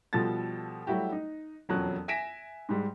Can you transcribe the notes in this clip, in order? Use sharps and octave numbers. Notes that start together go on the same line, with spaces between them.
B2 F3 G3 F4 A4 A6
F#3 G3 A3 E4 F#4 G4
D#4
E1 F2 F#3 C#4 F#6
E5 G#5 A#6 B6 D7 E7
G#2 G3 G#3